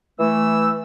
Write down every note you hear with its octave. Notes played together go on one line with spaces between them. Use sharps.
E3 A3 E6